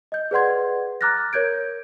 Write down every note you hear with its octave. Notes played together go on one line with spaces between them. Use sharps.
D#5 G6
G#4 B4 D5 F#5 C6 G#6
A#5 D6 F6 F#6 A6 A#6
A#4 C#5 G6 G#6 D7